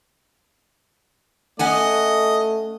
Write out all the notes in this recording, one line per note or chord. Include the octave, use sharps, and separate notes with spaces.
A3 C#4 D#5 F#5 G#5